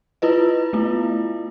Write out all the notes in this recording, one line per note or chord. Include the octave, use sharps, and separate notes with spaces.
E4 F4 B4 D#5
A3 B3 E4 F4